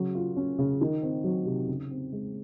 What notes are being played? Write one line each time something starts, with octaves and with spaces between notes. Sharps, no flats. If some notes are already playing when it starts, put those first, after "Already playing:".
Already playing: C#3 F#3
F4
C#4
C#3
D#3
C4
F#3
C3
C#3
C4
G#3